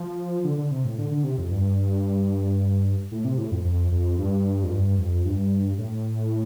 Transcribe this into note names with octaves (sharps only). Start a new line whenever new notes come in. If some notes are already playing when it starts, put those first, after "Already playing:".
Already playing: F3
D3
D3
C3
A2
D3
D3
C3
F2
G2
A2
C3
A2
F2
F2
F2
G2
F2
G2
F2
G2
A2